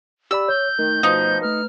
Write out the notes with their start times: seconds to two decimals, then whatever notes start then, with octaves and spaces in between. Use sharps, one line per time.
0.31 G4 D5 B5 E6
0.48 C#5 G6
0.79 D#3 A3
1.03 B2 F3 D#4
1.42 A3 B4 F6